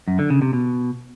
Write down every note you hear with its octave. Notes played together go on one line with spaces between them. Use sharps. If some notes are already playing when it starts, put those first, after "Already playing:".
F#2
D3
C#3
C3
B2